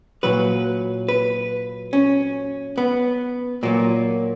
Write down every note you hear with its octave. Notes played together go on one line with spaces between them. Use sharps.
A#2 F#3 B4
B4
C#4
B3
A#2 F#3 A#3